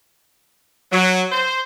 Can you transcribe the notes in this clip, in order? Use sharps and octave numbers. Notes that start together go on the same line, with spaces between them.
F#3
C5